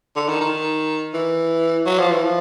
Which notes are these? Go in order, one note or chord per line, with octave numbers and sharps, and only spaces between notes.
D3
D#3
D#3
E3
F#3
F3
E3
F3